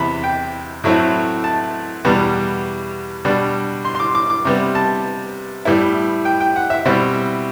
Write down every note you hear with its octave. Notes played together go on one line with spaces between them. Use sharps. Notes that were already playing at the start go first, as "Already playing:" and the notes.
Already playing: E2 C3 E3 B3 B5
G5
A2 F#3 A3 C4 E4
A5
E2 B2 G3 B3
B2 G3 D4
C6
C6
D6
D6
D6
C3 G3 B3
A5
A2 G3 B3 E4
G5
G5
F#5
E5
B2 G3 C4 E4